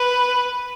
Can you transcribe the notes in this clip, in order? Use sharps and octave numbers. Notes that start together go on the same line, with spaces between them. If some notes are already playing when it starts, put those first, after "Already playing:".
Already playing: B4